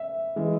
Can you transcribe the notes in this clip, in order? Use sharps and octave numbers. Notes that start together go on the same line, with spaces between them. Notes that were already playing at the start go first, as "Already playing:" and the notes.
Already playing: E5
E3 G#3